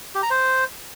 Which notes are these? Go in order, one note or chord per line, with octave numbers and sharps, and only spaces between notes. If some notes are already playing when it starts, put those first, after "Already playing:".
G4
A#5
C5